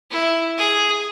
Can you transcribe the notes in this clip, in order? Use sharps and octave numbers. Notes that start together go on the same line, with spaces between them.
E4
G#4